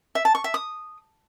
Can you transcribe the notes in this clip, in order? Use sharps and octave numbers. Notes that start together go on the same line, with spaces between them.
E5
A5
C#6
E5
D#6